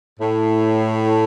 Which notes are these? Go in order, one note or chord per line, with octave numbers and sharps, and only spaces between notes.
A2